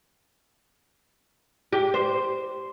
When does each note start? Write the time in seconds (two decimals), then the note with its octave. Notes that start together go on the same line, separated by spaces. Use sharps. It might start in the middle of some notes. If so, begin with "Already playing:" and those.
1.73 G4
1.94 C5